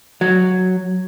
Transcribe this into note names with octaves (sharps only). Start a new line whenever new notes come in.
F#3